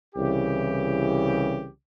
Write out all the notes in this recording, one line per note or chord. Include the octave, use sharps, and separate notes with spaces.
C2 C#3 E3 G4